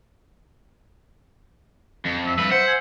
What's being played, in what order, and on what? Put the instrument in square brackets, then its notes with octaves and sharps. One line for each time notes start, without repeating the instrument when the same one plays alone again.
[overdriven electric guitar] F2
[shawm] E5
[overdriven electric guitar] G2 B4
[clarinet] C5 [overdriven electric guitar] F#5
[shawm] G#5